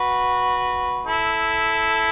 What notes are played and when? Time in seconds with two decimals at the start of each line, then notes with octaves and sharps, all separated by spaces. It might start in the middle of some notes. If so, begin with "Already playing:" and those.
Already playing: F#4 B4
1.06 E4 A4